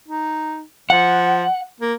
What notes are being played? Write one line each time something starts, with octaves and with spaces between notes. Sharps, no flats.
D#4
F3 F#5
A#3